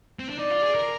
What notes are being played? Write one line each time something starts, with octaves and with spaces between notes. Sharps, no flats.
C4
D4
D#4 D5
F4
G#4
A#4